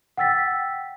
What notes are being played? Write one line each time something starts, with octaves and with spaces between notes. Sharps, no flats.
F#5 G5 E6 A6 B6